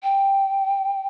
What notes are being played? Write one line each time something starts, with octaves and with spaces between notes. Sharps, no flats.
G5